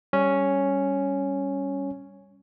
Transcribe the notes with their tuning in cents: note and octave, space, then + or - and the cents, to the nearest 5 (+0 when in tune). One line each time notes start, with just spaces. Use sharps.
G3 +0 C#4 +0